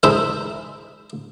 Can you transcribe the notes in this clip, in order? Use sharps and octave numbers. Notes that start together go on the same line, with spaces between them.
G#3 D#4 E4 A4 C5 E5